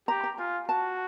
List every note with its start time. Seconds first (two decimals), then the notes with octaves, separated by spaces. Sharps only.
0.08 G4 A#5
0.24 A#5
0.38 F4 G#5
0.68 F#4 A5